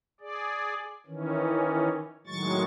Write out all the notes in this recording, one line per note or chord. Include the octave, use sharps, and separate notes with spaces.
G#4 D5
D#3 E3 C#4
A2 D#3 F#3 G#3 C#6 A6